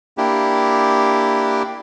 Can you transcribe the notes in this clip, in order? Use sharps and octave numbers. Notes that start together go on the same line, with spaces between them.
A#3 D4 E4 G4